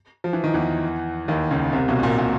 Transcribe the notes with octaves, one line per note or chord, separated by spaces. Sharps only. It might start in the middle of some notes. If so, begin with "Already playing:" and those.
F3
E3
D#3
E2 E3
D#2 D#3
C#2 C#3
C2 C3
B1 B2
B2
A#2
A#2